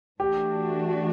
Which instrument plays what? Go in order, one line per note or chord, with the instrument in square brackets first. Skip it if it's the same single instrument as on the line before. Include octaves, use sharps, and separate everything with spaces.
[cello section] E3 A3 D4 F#4 [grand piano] G4